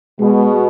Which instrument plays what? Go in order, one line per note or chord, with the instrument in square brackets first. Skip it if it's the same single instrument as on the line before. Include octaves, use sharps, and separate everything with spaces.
[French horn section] B2 [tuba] G#3